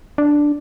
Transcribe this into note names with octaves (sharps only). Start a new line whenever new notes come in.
D4